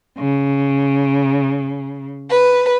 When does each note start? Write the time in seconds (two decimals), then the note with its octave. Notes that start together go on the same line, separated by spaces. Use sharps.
0.18 C#3
2.30 B4